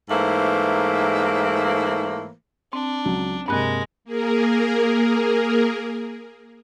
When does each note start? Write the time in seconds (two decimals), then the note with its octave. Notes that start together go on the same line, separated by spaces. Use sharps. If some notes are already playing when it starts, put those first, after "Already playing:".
0.09 G#2 E3 A3 A#3 C5
2.73 C4 D4
3.05 C#2 F#3
3.48 G2 C3 G#3 A#3 F#6
4.05 A#3 G#4 A#4